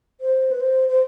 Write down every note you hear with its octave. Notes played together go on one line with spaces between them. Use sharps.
C5
B4
C5
C5